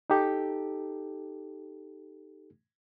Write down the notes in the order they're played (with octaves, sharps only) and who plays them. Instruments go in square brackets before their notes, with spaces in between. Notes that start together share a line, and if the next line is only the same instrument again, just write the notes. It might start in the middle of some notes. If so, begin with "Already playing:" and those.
[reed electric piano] D#4 G4 A4